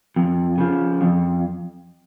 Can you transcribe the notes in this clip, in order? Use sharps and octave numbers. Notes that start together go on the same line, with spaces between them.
F2
C#3 F3
F2